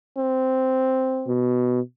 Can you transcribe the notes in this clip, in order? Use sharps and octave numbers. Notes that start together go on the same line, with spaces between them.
C4
B2